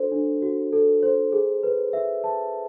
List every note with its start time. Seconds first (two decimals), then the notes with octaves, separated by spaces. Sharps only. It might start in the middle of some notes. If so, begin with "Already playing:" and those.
Already playing: D4 F#4 A4 C5
0.11 D4
0.42 F#4
0.73 A4
1.03 C5
1.32 G#4
1.63 B4
1.93 E5
2.24 A5